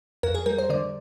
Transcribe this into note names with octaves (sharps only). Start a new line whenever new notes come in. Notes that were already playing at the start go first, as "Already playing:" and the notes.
F2 A#4
G#4
G3 A#4
C5
D3 D5